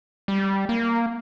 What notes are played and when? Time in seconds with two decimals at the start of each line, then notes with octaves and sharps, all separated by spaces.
0.28 G3
0.69 A#3